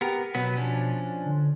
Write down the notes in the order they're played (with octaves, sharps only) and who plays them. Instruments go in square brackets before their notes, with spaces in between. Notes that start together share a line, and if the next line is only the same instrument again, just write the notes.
[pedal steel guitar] B3 A#4 [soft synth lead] G4
[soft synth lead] B2 [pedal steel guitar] F#3 B3 B4
[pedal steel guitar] F3 C#4 D4
[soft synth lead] D3